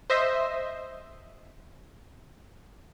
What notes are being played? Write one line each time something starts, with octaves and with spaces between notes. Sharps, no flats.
C5 D#5 E5